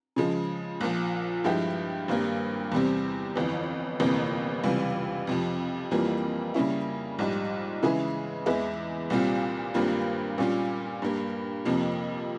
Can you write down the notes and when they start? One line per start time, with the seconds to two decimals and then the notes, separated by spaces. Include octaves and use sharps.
0.16 C#3 F3 G#3
0.81 A#1 A#2 F3
1.44 G2 F3 G#3 E4 G4
2.08 G#1 G2 G3 A#3
2.72 E2 C3 G3 C4
3.36 G1 F2 E3
4.00 G1 F2 C3 E3 A#3
4.64 C#2 C3 E3 G3
5.27 F2 C3 F3
5.91 F2 E3 G3 A#3 F4
6.54 C#3 G3 A#3 C#4 E4
7.19 A#1 G#2 G3
7.83 C#3 E3 G#3 E4 G#4
8.46 E2 E3 G#3 E4
9.10 C2 A#2 G3 C4 F4
9.74 G#1 G2 G3 A#3 F4
10.38 A#2 G3 C#4 F4
11.02 G2 G3 A#3
11.65 F2 C3 F3 A#3